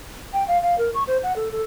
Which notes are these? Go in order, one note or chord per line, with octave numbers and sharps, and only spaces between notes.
G5
F5
F5
A#4
C#6
C5
F#5
A4
A4